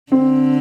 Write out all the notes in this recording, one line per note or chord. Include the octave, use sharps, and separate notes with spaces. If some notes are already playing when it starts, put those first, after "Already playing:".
D3 C4